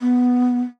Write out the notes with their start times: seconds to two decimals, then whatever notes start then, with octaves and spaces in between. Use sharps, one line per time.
0.01 B3